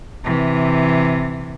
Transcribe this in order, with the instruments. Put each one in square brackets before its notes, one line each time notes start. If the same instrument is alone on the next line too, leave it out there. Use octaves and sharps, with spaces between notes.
[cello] C3 E3